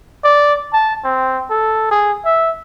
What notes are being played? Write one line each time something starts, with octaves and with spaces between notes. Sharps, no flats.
D5
A5
C4
A4
G#4
E5